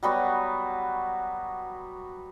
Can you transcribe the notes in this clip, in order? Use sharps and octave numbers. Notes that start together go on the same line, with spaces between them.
F#3 G3 B3 F#4